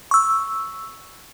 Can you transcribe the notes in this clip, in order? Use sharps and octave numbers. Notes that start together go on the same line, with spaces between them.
C#6 E6